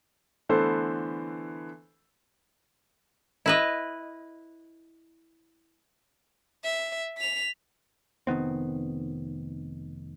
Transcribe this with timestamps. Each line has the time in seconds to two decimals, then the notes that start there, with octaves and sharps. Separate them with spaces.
0.49 D3 E3 A3 B3 A4 C5
3.46 E4 B4 D#5
6.64 E5
7.18 B6 F7
8.27 F1 D#3 B3 C4